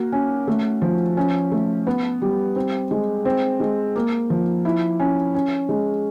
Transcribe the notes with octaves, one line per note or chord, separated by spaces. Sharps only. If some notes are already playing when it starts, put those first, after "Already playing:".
Already playing: A#3 F#4
C#4
A3
F3
C#4
A3
B3
G3
C4
G#3
C4
G#3
A#3
F3
E4
C#4
C#4
G#3